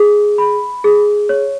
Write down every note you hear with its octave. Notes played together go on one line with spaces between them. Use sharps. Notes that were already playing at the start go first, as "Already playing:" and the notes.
Already playing: G#4
B5
G#4
C#5